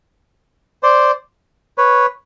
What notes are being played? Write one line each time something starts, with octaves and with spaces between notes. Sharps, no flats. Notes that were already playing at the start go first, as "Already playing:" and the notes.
C5 D5
B4 C#5